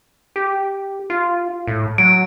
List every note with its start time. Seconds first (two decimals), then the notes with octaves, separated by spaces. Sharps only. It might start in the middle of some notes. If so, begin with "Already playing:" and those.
0.36 G4
1.10 F4
1.67 A2
1.98 F#3 D7